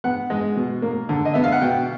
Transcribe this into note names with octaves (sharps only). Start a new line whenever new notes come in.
B3 F#5
G#3
B2
A#3
D3
D#5
B3 E5
F5
F#5
B2 G5